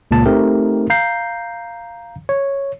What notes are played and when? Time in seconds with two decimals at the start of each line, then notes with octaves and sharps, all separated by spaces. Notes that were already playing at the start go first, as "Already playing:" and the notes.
0.11 C#2 A#2 A#3 A5
0.26 A3 C4 D#4 G4 A#4
0.90 F5 A#5 G6 C7
2.29 C#5